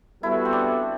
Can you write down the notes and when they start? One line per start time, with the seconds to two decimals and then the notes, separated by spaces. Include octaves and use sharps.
0.22 G3 B3 E4 F#4 A4
0.45 C4
0.53 D4